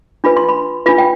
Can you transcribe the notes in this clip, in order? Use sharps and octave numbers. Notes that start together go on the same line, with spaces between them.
D4 F4 B4 B5
C6
B5
D4 F4 B4 B5
G5